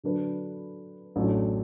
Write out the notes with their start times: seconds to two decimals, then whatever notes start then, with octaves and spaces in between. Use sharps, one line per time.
0.04 D3 F#3 D4 B4
1.16 A1 A2 F#3 D4